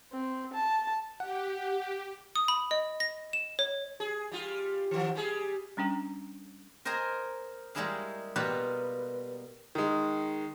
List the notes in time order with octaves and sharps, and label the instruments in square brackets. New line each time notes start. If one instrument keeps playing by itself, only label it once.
[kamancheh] C4
A5
[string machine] G4 [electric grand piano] F#5
[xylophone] D#6
B5
D#5
A#6
E7
C#5
[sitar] G#4
G3 F4
D#3 F3
G3 G#4
[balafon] G3 C#4 D4 G5 A#5
[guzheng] A#4 C5 D#5 G#5 A#5 C6
G3 G#3 A#3 E4 G#4 F5
B2 G3 A#3 F4 G4 B4
[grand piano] D#3 G#3